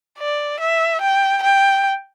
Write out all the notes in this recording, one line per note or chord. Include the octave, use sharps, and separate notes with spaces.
D5
E5
G5
G5